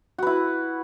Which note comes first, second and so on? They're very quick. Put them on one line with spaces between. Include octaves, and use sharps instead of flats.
F#4 B4 E4